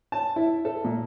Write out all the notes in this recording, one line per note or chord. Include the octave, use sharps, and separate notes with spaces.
A5
E4
A4
A#2